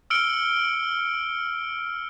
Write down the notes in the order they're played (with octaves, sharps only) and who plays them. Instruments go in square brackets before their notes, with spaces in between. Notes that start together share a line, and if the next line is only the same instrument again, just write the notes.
[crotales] E6 F6 C#7 D7 G7